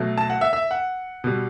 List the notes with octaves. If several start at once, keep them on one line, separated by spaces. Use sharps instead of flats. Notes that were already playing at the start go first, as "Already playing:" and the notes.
Already playing: B2 F#3 A3
A5
F#5
E5
E5
F#5
B2 G3